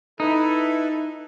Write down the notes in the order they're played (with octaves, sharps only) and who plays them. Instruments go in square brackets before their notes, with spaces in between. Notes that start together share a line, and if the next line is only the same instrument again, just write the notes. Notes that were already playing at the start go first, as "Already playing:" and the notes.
[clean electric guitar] D#4 [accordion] E4 A4 B4